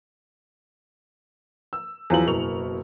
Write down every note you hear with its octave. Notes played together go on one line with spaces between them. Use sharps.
E6
E2 F3 F#3 E4 F#7
F#1 B2 E4 A#4 C#6 F7